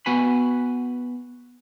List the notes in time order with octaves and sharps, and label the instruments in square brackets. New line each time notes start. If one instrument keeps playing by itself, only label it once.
[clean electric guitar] B3 F#4 B4 G#5 B5